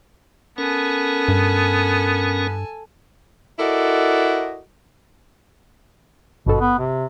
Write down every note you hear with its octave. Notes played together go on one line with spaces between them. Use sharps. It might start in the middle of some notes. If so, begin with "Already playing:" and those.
B3 C#4 A4 A#4 G#5
G2
E4 F#4 A4 A#4 D5 D#5
G#1 G2 B2 A4
B3
C3